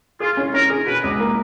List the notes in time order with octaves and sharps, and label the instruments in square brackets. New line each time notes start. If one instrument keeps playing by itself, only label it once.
[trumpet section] F4 [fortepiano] G#4
[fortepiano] C#4
[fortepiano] C#4 [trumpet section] A#4
[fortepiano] G#4
[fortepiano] B2 [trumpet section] B4
[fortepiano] C#2
A#3